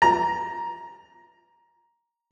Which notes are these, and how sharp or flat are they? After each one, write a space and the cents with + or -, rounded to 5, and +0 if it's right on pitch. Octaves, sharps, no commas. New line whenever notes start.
A#5 +10